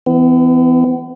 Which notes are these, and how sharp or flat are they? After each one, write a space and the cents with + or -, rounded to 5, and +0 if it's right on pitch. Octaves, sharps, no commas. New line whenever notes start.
E3 +0 B3 +40